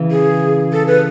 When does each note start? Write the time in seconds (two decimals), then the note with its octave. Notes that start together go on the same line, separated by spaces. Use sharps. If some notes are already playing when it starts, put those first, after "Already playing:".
Already playing: C#3 E3
0.11 G#4
0.73 A4
0.87 B4